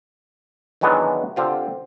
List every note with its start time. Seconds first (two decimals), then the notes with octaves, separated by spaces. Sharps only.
0.81 D#3 E3 F#3 G#3 B3 D4
1.36 D3 C4 F4 G4